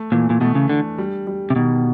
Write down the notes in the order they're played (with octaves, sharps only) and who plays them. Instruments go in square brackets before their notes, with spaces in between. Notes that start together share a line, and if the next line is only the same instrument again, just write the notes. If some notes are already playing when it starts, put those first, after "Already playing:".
Already playing: [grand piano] A3
[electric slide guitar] A#2 [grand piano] E3
[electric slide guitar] A#2
[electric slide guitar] B2 [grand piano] A3
[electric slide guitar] C#3
[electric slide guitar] D3 [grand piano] D4
[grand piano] G3
G3
[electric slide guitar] C3
[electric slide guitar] B2 [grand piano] D#3